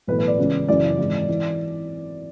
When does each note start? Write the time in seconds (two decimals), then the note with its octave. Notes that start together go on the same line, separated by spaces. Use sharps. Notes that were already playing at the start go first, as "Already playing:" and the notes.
0.07 B1 A2 E3 B4
0.18 B4
0.28 D5
0.38 C#2 C#3 E3
0.68 F#1 F#2 C#3 E3 D5
0.99 G#1 G#2 E3
1.28 E3